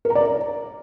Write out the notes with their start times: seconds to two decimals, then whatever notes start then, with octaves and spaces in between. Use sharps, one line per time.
0.05 A#4
0.10 A#5
0.15 D5
0.21 A#4